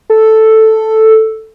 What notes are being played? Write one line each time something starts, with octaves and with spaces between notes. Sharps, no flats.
A4